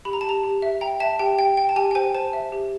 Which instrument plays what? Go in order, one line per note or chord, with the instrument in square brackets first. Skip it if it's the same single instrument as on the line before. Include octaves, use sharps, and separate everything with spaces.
[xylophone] G4 B5
A#5
A5
G4 A#5
G4
E5
G5 A#5
E5 A5
G4 G5
G5
G5
A5
G4 G#5
G5
C5 G#5
C5 A5
E5
G4